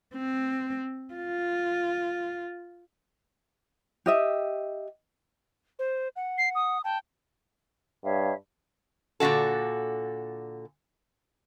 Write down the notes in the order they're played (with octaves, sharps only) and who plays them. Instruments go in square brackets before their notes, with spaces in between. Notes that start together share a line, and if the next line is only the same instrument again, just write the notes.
[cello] C4
F4
[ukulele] G4 D#5 E5
[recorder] C5
F#5
[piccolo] C7
D#6
[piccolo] G5 [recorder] A5
[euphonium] G2 [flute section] C#5 E5 F5
[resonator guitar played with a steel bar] A#2 D3 E3 F#4 A4